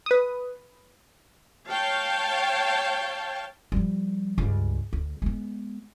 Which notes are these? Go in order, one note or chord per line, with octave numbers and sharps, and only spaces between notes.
B4 D#6
C#5 F5 G5 A5
F3 G3
C#2 G2
D2
G#3 B3